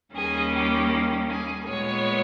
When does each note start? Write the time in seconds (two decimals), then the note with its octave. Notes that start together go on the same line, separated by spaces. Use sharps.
0.15 D#2 D#3 G3 A#3 C#4 G#4
0.54 G4
1.30 G#4
1.68 A#2 G#3 B3 C#5